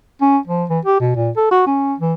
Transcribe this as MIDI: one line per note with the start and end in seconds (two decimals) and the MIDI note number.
0.21 0.38 61
0.47 0.64 53
0.69 0.79 52
0.85 0.97 67
1.00 1.14 47
1.16 1.30 46
1.36 1.50 69
1.51 1.62 66
1.67 1.94 61
2.00 2.14 52